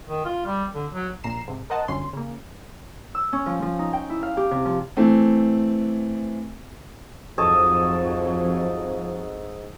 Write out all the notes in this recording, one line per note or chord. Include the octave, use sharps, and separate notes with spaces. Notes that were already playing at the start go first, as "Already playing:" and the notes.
D#3
F4
G3
D3
F#3
A#1 A#2 A#5 C7 E7
G#2 C3
A#4 C5 D#5 F#5 A5
G1 F#2 D3 C#4 C6
C#3 A#3
E6
C#4
F3
F3
D#4
G5
E4
F5
G4
C3
F3
E3 A3 C4
F2 G#2 F3 F#3 A4 C#5 D#5